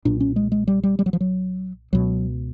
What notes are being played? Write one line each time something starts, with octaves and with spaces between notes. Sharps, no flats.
B1 A#2 D4
C#4
G#3
G#3
G3
G3
G3
F#3
F3
F#3
C#2 B2 F#3